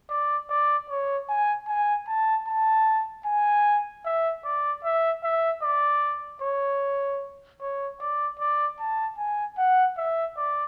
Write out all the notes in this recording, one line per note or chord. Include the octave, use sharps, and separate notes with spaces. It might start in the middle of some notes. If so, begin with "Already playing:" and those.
D5
D5
C#5
G#5
G#5
A5
A5
G#5
E5
D5
E5
E5
D5
C#5
C#5
D5
D5
A5
G#5
F#5
E5
D5